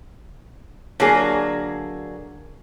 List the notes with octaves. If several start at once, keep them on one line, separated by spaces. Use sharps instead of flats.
D3 F#3 A#3 G#4